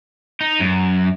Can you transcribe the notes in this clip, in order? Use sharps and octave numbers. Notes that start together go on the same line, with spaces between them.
D#4
F#2